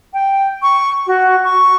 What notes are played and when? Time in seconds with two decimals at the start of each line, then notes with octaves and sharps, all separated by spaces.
0.13 G5
0.62 C#6
1.06 F#4
1.44 C#6